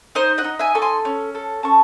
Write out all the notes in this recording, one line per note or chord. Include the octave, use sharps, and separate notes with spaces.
D#4 C5 D#5
D#5 F#5
D#4
E5 G#5
A4 C#6
G#5 C6
C#4
A4
C#4 A5 C#6